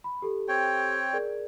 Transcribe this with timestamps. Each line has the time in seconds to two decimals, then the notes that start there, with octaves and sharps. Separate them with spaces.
0.04 B5
0.22 G4 A4
0.48 C4 C#5 G5
1.13 G#4 A#4 D5